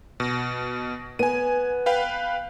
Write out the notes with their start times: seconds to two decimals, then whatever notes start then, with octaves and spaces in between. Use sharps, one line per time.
0.20 B2
1.19 B3 G#5 D#7
1.86 B4 F5 G5